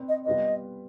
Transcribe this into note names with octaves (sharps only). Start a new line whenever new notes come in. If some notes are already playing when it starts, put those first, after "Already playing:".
Already playing: C4 B4 D5
D#5
G3 B3 F4 B4 D5 D#5